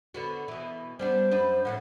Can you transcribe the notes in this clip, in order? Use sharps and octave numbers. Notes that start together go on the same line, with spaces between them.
D3 B3 F#4
B2 E3
G3 B3 D4 C5
F#2 D4 B4
F2 A2 F3 F#5